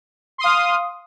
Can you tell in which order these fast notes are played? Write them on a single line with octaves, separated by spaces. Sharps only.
C6 D#6 F5